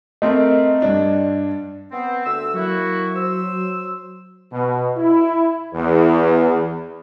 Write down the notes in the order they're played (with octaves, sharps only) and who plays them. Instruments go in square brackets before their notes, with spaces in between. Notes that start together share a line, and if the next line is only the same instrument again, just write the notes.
[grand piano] A3 C4 A#4 [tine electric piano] D#5
[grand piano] G2 D4
[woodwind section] B3 C4
D2 E6
[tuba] F#3 [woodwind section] A#3 E4 F#4
[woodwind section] C5 E6
[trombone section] B2
E4
E2